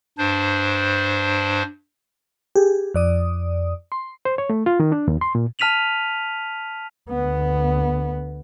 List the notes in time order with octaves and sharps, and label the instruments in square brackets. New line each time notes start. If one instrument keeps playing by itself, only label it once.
[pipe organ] G2 D4 C5
[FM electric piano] G4 G#4
F2 D5 D#6
C6
[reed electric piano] C5
C#5
A3
F4
D#3
D4
D#2
C6
A#2
[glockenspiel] A5 F6 B6 D#7 F7 F#7
[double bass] D2 B3